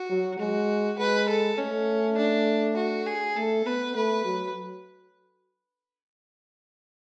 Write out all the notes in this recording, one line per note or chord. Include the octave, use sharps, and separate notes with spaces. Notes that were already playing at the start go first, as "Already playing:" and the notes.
Already playing: F#4
F#3
G#3 F#4
G#3 B4
A4
A3 C#4
D4
F#4
G#4
A3 A4
B3 B4
A3 B4
F#3